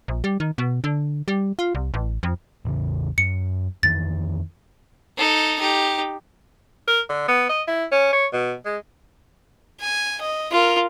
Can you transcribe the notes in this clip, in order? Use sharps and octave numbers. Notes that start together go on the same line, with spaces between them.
A#1
G3
D#3
B2
D3
G3
F4
C2
A1
F2
A1 E2 C#3
F#2 C#7
F2 D#3 E3 A6
D#4 A4
D#4 G4
A#4
D3
B3
D#5
E4
C#4
C#5
B2
G#3
G#5
D#5
F4 A#4